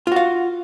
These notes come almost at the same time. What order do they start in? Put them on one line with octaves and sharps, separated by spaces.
F4 F#4 F5